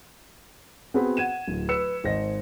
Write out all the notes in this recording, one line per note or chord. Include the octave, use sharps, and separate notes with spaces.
B3 C4 F#4 G#4 B4
F#5 G#6 D#7 E7
D1
B4 E6 C#7 E7
G#1 C5 D#5 A#6